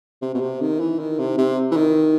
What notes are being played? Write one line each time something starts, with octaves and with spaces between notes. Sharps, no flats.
C3
B2
C3
D#3
E3
D#3
C3
C3
E3
D#3